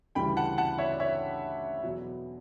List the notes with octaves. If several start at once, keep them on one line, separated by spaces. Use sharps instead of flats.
D2 C#3 E3 G3 G5 B5
F#5 A5
F#5 A5
C#5 E5
D5
C#5 E5
E2 B2 F#3